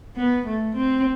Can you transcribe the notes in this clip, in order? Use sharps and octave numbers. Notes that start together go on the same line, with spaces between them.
B3
A3
C4